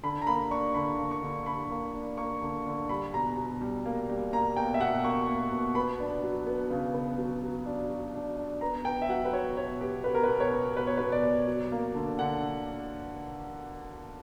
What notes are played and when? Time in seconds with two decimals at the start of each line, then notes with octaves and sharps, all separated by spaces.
0.03 D3 B5
0.22 A#5
0.27 A#3 B5
0.51 D4 C#6
0.74 D3 B5
0.98 A#3
1.11 C#6
1.22 D3
1.46 D3 B5
1.70 A#3
1.94 D4
2.17 A#3 C#6
2.42 D3
2.66 D3
2.89 G3 B5
3.14 B2 A#5
3.37 B2
3.61 G3
3.85 A#3
4.09 G3
4.33 A#3 A#5
4.56 B2 G5
4.74 E5
4.80 B2 F#5
5.04 A#3 C#6
5.27 A#3
5.52 B2
5.75 B3 B5
6.00 D4
6.23 F#3
6.47 B3
6.70 C#3
6.94 B3
7.18 F#3
7.42 F#3
7.66 D4
7.89 F#3
8.14 D4
8.38 D4
8.61 B3 A#5
8.85 B3 G5
9.02 E5
9.09 F#3 F#5
9.25 B4
9.33 F#3 C#5
9.57 B2 C#5
9.81 B3 G4
10.04 B3 B4
10.15 A#4
10.24 B2 B4
10.40 C#5
10.52 B3
10.76 B2 B4
10.87 C#5
10.97 B2 B4
11.12 D5
11.24 B2
11.47 F#3
11.72 A#3
11.95 D3
12.19 D3 F#5